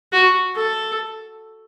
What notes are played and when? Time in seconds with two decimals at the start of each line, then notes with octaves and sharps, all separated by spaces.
0.13 F#4
0.56 A4